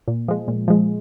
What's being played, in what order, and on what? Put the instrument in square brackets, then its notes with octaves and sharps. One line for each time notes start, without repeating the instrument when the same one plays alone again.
[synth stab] A#2
F3 G#3
A#2
F3 G#3